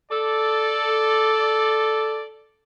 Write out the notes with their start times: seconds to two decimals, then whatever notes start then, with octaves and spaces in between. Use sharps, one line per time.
0.10 A4 D5